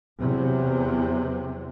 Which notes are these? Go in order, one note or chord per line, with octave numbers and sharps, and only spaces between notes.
E2 C3 F#3